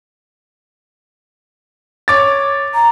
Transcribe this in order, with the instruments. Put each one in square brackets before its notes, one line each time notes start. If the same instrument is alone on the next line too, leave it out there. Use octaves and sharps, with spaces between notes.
[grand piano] C#5 D6 A6
[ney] A#5